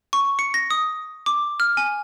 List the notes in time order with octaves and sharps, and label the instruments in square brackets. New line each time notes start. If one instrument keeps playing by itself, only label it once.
[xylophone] C#6
C#7
A#6
D#6
D6
F6
G#5